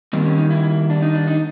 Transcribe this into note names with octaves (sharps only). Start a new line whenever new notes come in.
D#3 G3 A#3 C4
C#4
D#4
E4
D4
D#4
D4
D#4